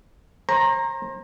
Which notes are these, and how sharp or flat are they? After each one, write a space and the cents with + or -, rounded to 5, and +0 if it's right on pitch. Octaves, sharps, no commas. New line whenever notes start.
C5 +40 A#5 +0